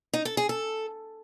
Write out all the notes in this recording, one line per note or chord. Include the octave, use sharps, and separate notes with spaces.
D#4
A4
G#4
A4